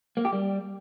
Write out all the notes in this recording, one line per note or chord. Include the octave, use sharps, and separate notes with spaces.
A#3
G4
G3